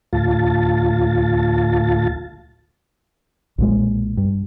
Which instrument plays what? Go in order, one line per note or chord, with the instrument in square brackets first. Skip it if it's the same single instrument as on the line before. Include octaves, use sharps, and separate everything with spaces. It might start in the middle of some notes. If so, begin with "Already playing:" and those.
[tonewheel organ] D2 A2 F4 A5
[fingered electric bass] B1 A#2 G#3
G2